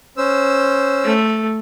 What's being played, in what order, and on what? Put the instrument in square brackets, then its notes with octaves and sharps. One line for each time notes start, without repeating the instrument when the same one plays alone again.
[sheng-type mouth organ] C#4 C5 E6
[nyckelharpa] A3